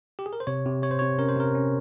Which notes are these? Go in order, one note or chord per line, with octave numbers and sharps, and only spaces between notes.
G4
G#4
A#4
C5
C3 C#5
C3
C3 C#5
C5
C3 C#5
C#4 A#4
C5
C3 A#4
C#4